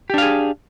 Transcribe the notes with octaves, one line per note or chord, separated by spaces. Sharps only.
D4 G4 G#4 F5